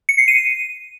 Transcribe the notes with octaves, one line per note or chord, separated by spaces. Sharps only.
C#7
C7
D#7